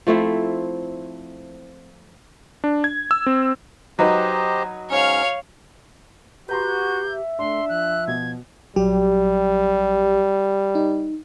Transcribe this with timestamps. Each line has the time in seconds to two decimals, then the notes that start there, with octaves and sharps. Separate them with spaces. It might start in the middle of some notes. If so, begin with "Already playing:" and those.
0.07 F3 A3 C4 E4
2.64 D4
2.84 G#6
3.11 E6
3.26 C4
3.99 F#3 D#4 G4 B4 C5 D#5
4.90 G#2 C#4 C#5 F5
6.49 F#4 G4 B4 A#5 C6 G6
7.07 E5
7.39 A3 D4 C6
7.69 F3 F#6
8.08 B2 G#6
8.76 A#1 F#3 G3 G4
10.75 D#4